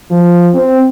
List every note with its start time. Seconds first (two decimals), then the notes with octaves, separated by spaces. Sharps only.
0.11 F3
0.54 C4